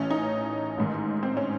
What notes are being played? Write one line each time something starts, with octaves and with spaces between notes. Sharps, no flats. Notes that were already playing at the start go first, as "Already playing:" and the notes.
Already playing: A1 A2 E3 C#4
D#4
A1 G#2 D#3
C4
C#4